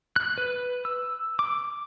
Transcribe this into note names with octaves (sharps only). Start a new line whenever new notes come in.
F#6
B4
E6
D6